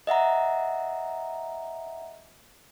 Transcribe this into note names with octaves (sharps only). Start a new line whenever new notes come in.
D#5 E5 F#5 A#5